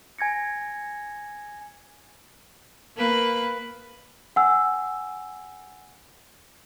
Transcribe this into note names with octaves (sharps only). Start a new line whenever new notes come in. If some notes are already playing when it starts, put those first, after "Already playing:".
G#5 G#6 A#6 C#7
A#3 B4
F#5 G#5 E6